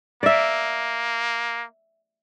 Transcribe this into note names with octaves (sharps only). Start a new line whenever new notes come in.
A#3 D5 E5